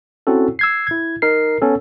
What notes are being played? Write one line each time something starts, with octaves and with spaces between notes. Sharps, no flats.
C4 C#4 E4 F#4 A4
E6 G#6 C7
E4 G#6
D#4 A#4 C7
B3 C#4 A4